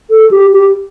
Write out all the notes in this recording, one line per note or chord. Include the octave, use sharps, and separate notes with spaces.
A4
G4
G4